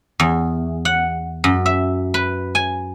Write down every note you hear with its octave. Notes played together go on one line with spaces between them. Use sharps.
E2
F#5
F#2
E5
B4
G#5